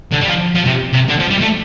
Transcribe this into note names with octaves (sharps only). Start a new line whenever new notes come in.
D3
G3
F3
F3
C3
C3
D3
F3
G3
A3